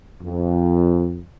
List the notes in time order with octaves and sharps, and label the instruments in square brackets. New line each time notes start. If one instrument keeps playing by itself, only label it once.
[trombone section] F2